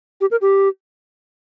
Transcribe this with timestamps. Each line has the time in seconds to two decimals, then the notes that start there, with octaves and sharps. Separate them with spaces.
0.21 G4
0.31 A#4
0.42 G4